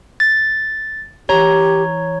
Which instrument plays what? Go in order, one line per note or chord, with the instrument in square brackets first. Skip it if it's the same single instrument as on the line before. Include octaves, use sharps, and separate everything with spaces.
[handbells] A6
[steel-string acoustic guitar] E3 A#5 [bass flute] G4 [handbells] C#5